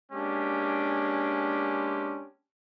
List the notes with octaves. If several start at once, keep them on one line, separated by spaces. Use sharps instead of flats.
G#3 A#3 C#4 D4 G4